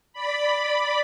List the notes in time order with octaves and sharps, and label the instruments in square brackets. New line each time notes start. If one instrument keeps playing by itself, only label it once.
[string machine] D5 B5